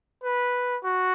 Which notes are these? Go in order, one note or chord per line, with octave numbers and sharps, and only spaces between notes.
B4
F#4